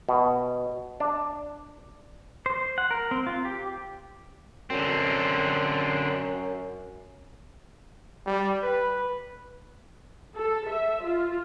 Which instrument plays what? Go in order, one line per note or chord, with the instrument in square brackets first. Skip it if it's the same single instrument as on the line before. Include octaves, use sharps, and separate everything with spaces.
[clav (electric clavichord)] B2
D4
[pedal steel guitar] C5
F#5
A#4
C4
F4
G4
[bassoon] F#2 [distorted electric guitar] D3 C4
[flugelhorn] G3
B4
[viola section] A4
E5
F4